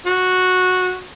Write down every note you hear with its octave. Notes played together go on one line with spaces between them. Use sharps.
F#4